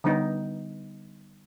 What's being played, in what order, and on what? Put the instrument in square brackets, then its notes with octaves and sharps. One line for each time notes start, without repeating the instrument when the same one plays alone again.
[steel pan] D3 G3 B3 D#4